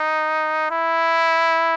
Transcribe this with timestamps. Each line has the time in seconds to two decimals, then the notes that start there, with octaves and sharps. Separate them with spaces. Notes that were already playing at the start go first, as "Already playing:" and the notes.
Already playing: D#4
0.71 E4